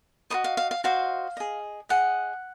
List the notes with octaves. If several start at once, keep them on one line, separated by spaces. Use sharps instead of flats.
F#4 C5 D#5 D#6
F5
F5
F5
F#4 C5 D#5 F5
G#4 D#5
G#4 D#5 F#5